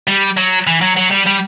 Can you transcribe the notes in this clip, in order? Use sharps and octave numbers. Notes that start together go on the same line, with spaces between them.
G3
F#3
E3
F#3
F#3
G3
G3